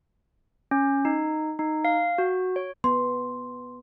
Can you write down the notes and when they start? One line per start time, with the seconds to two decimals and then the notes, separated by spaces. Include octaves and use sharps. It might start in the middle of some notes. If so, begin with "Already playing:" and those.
0.71 C#4
1.05 D#4
1.59 D#4
1.85 F5
2.18 F#4
2.56 C#5
2.84 B3 C6